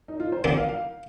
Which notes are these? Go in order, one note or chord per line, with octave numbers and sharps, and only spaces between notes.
D#4
F4
C5
D#2 D3 F3 C4 D5
F5
F5